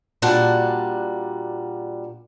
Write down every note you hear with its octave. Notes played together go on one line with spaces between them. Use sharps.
A#2 G3 D4 F#4 F#5 A5